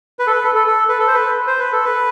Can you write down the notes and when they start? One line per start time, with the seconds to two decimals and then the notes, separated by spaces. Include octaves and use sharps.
0.19 B4
0.27 A4
0.31 B4
0.44 A4
0.55 A4
0.67 A4
0.89 B4
0.99 A4
1.07 C5
1.14 B4
1.47 C5
1.59 B4
1.72 A4
1.84 B4